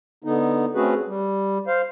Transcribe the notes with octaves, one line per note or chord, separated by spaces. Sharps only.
D3 B3 D#4
A3 C4 C#4 F#4 G#4 B4
G3
C5 F5